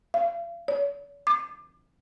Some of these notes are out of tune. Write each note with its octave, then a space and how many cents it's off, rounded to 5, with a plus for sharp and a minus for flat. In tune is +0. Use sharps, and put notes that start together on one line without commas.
F5 -35
C#5 +45
D6 +35